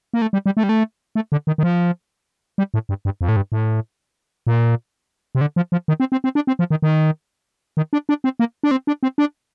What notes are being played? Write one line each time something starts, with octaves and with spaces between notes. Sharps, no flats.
A#3
A3
G3
G3
A3
G3
A3
A3
D3
D#3
D#3
F3
G3
A2
G2
G2
F2
A2
G2
A2
A#2
C3
D3
F3
F3
D#3
C4
C4
C4
D4
C4
F3
D#3
D#3
D#3
D4
D4
C4
A#3
D4
C4
D4
C4
D4